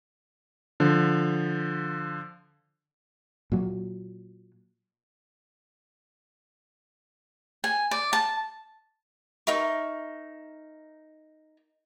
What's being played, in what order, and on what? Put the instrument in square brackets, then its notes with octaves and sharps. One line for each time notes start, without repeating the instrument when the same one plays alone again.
[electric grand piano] D3 F3
[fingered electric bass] A#2 F#3
[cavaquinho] G#5
D5
A5
D#4 A#4 E5 C#6